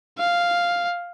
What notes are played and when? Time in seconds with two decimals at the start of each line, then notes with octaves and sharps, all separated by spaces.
0.18 F5